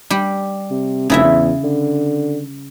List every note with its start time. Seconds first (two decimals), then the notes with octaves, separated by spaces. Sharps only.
0.10 G3 G4
0.71 C3
1.10 F1 C#3 E4 E5
1.24 E2
1.64 D3